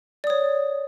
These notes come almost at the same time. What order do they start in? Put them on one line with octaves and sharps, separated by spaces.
D5 D#6 C#5